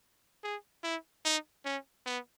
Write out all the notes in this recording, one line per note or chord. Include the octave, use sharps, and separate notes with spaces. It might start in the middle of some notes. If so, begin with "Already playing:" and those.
G#4
E4
D#4
C#4
B3